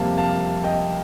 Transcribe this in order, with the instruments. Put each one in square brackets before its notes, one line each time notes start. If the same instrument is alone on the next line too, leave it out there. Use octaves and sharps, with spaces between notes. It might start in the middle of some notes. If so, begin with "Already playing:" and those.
Already playing: [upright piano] F2 C3 G3 A#3 F5 A5
F5 A5
D#5 G5